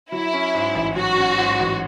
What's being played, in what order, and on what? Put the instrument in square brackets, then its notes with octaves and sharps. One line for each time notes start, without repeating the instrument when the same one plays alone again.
[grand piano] F#3 [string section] E4
[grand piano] C#4
G#2
A1
[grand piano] F#3 [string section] F#4
[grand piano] C#4
G#2
A1